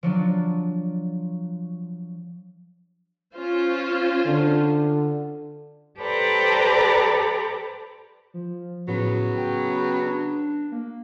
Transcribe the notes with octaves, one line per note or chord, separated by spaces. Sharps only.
F3 F#3 D4
C#4 F4 C5
D3
G4 A4 B4 C5 D5 A#5
F3
A2 C#3 F#3 B3
G5
D4
A#3